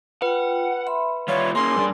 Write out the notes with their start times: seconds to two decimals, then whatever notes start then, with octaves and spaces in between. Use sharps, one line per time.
0.22 F4 B4 F#5 G5
0.87 E5 B5 C6
1.28 G3 F4 C#5
1.55 A#3 C#4 G#4 A#4 G#5 C6
1.75 G2 D4